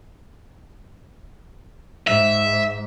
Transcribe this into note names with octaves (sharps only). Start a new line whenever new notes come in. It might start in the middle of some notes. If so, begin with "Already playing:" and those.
G#2 E5